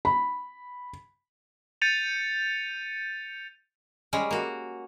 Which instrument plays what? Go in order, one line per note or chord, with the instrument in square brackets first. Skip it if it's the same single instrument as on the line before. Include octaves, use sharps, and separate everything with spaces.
[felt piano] B5
[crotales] G6 A6 C#7 D#7 F7
[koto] G3 G#3 C#4
A#3 F#4